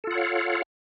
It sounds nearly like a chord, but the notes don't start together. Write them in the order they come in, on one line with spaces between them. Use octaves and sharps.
A4 F4 F#5 C#5 F5